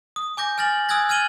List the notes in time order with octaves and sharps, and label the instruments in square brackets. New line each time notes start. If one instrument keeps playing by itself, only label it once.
[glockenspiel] D#6
G#5 D6 G6 A#6
G#5 F6 A6 A#6 F#7
G#5 D#6 E6 F#6 G#6 A#6
F6 G#6 A6 D#7 F#7 G7